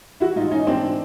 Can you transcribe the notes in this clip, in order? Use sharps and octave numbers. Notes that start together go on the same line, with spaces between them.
E3 E4 F#4
G#2 D#4 F4
E3 C#4 D#4
G#2 C4 D4
E3